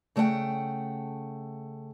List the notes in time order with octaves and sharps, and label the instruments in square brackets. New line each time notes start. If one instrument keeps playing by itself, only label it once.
[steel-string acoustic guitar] C#3 A3 D5 F#5 G5